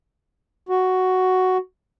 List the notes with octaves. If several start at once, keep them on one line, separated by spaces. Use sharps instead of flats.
F#4